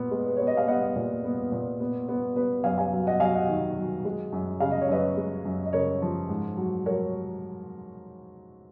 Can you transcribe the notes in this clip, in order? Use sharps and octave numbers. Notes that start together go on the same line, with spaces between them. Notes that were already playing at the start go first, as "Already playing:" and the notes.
Already playing: A#2 B3
G#3
B4
B3 C#5
D#5
F5
B3 D#5 F#5
A#2
B3
A#2
B3
B3
B3 B4
F#2 F5 G#5
F5 G#5
F#3
D#5 F#5
F#3 F5 G#5
D#5 F#5
D#3
F#3
G#3
F#2
C#3 F5
D#5
C#5
F#2 B4 D#5
G#3
F#2
D#5
C#3 A#4 C#5
F3
G#2
F#3
F#3 A#4 C#5